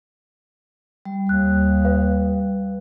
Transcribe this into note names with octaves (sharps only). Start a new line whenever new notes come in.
G3
D#2 F#6
B4 F5